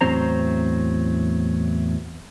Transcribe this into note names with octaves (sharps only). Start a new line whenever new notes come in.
E2 A2 F#3 C4 C5 A#5